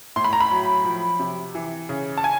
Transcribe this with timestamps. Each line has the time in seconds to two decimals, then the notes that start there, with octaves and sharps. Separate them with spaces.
0.16 A2 C6
0.24 B5
0.33 A#5
0.41 B5
0.51 F#3
0.85 F3
1.20 C3
1.55 E3
1.89 C#3
2.18 A5
2.24 G#5